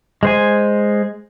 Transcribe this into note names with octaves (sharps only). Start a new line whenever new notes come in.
G#3 C5 G#5